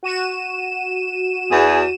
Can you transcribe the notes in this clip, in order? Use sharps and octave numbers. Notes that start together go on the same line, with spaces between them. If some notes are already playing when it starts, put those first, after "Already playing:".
F#4 D#7 E7
E2 G#4